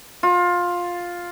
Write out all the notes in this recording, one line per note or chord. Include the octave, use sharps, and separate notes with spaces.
F4